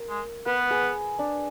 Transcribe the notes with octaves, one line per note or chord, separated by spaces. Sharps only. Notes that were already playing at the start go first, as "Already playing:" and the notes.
Already playing: A#4
G#3
B3 B4
G#4
D4